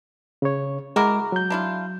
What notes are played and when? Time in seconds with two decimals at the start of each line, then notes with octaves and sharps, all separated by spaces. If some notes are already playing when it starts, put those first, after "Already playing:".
0.42 C#3 C#5
0.96 G#3 E4 F#4 A#4 D6
1.32 F#3 G6
1.50 D4 E4 F4